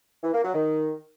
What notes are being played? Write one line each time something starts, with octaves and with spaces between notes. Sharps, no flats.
E3
A#3
F#3
D#3